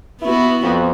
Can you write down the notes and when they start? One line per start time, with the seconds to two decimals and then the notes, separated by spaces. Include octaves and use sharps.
0.21 B3 E4 F#4
0.63 F2